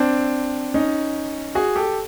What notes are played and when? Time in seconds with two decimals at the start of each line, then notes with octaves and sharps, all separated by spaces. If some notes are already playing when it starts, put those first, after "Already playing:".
Already playing: C4 D4
0.74 C#4 D#4
1.55 F#4 G#4
1.76 G4 A4